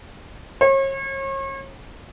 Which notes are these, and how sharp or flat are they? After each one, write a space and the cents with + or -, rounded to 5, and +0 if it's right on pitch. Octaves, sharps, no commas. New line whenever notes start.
C#5 -40